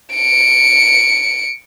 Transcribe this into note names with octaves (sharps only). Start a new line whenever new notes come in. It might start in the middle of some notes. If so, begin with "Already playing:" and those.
C#7 D7